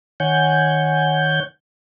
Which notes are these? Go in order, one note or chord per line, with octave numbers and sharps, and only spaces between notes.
D#3 C#5 F#5 G#5 G6